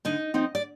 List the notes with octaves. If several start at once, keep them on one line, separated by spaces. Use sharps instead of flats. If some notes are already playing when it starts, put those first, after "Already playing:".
D3 D#4 D#5
F3 C4 D#4
D5